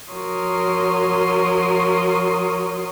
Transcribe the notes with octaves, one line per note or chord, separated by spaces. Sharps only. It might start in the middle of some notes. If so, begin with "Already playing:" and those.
F3 F#4 A#4 C#5 C6 D#6